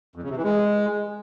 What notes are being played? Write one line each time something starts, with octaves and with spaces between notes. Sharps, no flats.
F2
C#3
C3
E3
G#3